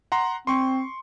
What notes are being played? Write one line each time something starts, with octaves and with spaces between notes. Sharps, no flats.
F#5 A#5 C6
C4 C6 C#6